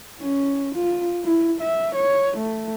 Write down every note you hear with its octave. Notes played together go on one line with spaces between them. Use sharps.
C#4
F4
E4
E5
C#5
A3